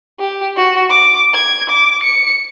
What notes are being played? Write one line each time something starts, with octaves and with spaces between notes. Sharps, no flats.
G4
F#4
D6
G#6
D6
C#7